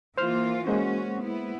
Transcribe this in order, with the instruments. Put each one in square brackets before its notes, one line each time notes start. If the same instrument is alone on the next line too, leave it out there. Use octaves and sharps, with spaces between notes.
[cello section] E3 A#3 F4 [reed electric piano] C5 F6
[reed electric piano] G#3 A#3 C5 [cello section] C#4 F#4
[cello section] B3 E4